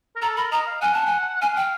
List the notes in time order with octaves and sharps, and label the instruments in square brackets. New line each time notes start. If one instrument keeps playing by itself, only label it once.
[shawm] A#4
[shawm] A4 [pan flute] A#5
[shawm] A#4 [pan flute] B5
[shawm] D#5 [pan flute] A#5
[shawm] F5
[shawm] F#5 [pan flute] G#5
[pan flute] A5
G#5
[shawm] F5 [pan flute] G#5
[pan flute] G5